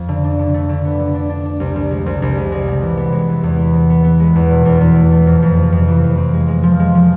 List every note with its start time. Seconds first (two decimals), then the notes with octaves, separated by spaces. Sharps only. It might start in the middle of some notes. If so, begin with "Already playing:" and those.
Already playing: F2
0.08 D3
0.24 D4
0.39 D3
0.54 A3
0.69 D3
0.85 B3
1.00 D3
1.14 D4
1.29 D4
1.45 D4
1.60 C2
1.76 C2
1.91 G#3
2.06 C2
2.22 C2
2.37 G#3
2.52 G#3
2.68 C3
2.82 E3
2.97 B3
3.12 G#3
3.29 E3
3.43 E2
3.59 B3
3.73 G#3
3.90 B3
4.04 B3
4.20 G#3
4.36 E2
4.51 B2
4.65 E2
4.81 E2
4.95 A3
5.11 A3
5.26 F2
5.42 F2
5.57 C3
5.72 F2
5.88 E3
6.03 F2
6.17 C4
6.33 G#3
6.48 G#3
6.63 F3
6.80 G#3
6.95 F3